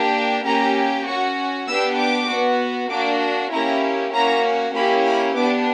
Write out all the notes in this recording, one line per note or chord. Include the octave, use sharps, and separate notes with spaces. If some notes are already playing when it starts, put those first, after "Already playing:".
Already playing: A#3 D4 G4
A#3 C#4 G4 A#5
C#4 F#4 C#6
B3 D4 G4 E6
D6
B3 F#4
A#3 D4 F#4 D6
A#3 C#4 E4 G4 A#5
A#3 C#4 F#4 A#5
A#3 C#4 E4 G4 B5
B5
B3 D4 G4 D6